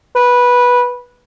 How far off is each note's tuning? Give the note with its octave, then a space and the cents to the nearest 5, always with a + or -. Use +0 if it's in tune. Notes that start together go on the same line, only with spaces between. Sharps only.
B4 -10